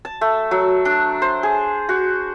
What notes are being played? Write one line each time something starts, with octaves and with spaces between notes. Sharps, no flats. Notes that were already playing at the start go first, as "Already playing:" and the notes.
A5
A3
F#3
D4
C5
G#4
F#4